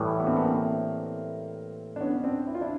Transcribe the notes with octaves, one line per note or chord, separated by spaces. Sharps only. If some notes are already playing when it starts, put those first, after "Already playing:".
Already playing: A2 E3 G3
B3
A#3 C4
B3
A#3 C4
D4
B3 C#4
C4 D4
E4
F4
D4 E4